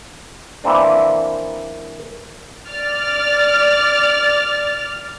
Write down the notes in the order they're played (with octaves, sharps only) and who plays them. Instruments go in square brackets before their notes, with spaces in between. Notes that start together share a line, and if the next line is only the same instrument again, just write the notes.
[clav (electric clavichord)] E3 A#3 C4 D4
[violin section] D5 F6 A6